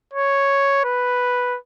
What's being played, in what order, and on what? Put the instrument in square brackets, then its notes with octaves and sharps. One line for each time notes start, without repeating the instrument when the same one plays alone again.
[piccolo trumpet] C#5
B4